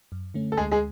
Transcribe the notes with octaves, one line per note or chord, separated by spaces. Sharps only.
F#2
D3 A3 C#4
A4
D2 G#3 G#4
G#3 G#4